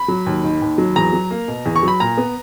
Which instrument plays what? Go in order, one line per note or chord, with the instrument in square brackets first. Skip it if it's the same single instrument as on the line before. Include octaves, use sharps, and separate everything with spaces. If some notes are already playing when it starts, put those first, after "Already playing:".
Already playing: [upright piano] B5
F#3
D#2
D#3
D#2
F#3
E2 A#5
F#3
A#3
B2
E2
C#6
F#3 B5
A#2 A#5
B3